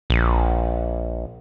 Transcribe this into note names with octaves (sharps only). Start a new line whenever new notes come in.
A#1